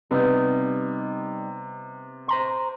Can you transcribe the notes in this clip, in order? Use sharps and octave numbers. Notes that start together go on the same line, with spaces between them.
C3 G3 B3 D#4
C5 A#5 C6